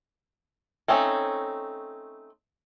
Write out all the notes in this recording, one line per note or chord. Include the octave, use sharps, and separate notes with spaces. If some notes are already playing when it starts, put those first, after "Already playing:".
A3 C4 C#4 D#4